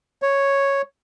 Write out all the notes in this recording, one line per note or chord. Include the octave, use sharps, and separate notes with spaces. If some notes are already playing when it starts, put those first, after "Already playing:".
C#5